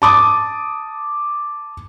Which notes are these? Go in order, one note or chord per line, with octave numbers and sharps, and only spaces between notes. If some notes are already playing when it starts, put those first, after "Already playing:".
A5 D6 D#6